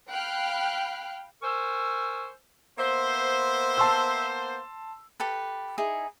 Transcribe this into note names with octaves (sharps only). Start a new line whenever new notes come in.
F5 G5 B5 F6 F#6
A#4 C5 G#5 C#6 E6
A#3 B3 C5 E5
A5 C6 E6
G4 A4 B4
D#4 E4 G#4